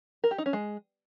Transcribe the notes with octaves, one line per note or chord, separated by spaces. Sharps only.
A#4
G4
D#4
C#4
G#3